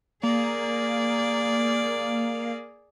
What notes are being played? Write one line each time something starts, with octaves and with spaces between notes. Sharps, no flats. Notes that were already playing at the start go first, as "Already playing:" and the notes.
A#3 G#4 D5